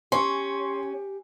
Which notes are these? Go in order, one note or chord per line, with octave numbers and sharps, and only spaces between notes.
C#4 G4 C6 C#6